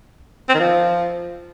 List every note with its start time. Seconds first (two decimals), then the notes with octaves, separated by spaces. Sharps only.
0.49 C4
0.54 D#3
0.60 F3